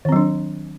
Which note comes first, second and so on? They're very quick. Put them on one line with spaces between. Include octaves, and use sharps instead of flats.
D#3 C4 F#3 D4